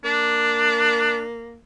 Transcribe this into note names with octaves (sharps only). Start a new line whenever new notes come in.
A#3 D4